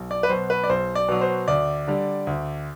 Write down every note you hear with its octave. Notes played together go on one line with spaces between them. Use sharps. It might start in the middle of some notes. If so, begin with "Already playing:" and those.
Already playing: B1
D5
B4
B2 F#3 C5
B4
D5
B1 C5
D5
B2 F#3
C5
D2 D5
D3 G3
D2